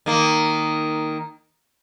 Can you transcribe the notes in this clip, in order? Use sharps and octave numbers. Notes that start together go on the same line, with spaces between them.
D#3 A#3